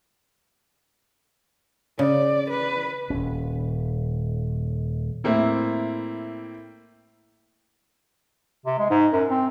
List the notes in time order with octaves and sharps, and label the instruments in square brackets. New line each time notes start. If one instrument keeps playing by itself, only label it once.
[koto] C#3 [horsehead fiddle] D5
[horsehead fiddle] B4
[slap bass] D#1 C#4
[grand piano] A2 A#3 C4 E4
[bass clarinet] C3
G#3
G#2
F#2
C4